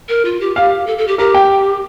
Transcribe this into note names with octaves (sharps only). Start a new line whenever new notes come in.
A#4
F4
G4
G4 F5
A4
A4
G4
G4 A#4
G5